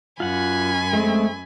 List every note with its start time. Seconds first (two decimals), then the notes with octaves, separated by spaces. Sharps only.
0.20 F#2 F4 F#5 G#5 B5
0.93 G#3 A3 C4